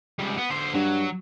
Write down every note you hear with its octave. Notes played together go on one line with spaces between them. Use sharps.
C#2 G3
B3
D3 C5
G2 F#3